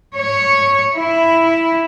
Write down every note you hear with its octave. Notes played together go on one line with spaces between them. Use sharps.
C#5
E4